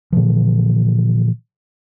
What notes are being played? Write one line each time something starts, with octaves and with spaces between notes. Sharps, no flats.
A#2 D3 E3 F3